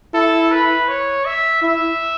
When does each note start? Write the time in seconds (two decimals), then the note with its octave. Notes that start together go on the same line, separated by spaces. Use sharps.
0.14 E4 A4
0.52 B4
0.88 C#5
1.25 E5
1.62 E4 E5